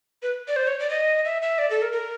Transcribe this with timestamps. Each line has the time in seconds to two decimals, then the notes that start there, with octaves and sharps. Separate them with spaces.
0.23 B4
0.48 D5
0.56 C5
0.67 C#5
0.79 D5
0.90 D#5
1.25 E5
1.42 E5
1.58 D5
1.70 A4
1.82 A#4
1.92 A#4